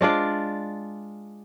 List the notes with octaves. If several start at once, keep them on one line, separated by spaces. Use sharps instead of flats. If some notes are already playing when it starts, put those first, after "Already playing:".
G#3 D4 F4 D5